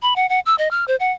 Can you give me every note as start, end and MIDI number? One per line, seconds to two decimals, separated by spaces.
0.02 0.14 83
0.16 0.28 78
0.29 0.40 78
0.46 0.55 88
0.58 0.69 75
0.71 0.85 89
0.88 0.96 72
1.00 1.12 78